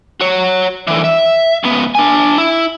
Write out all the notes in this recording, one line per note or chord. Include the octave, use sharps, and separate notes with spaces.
F#4 C#5
D3 E3
E5
C#2 B3
D4 G#5
E4